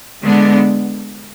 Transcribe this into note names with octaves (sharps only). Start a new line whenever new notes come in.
D3 G#3 B3 D4